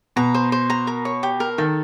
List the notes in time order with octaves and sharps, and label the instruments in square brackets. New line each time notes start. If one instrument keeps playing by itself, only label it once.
[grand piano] B2 [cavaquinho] A#5
[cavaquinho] C5
C5
A#5
A#4
C#5
G4
A#4
[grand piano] D#3 [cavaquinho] A4